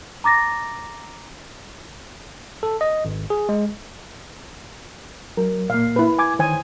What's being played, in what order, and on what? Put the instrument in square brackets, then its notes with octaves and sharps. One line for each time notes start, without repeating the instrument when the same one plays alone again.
[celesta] A#5 D6 A6 A#6
[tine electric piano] A4
D#5
G#1
G#4
G#3
[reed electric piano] F#3 [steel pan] A#4
[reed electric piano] A#2 A#3 [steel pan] F5
[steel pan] E4 B4
[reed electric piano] G#5 D6 G#6
[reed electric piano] D#3 [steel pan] C5 G#5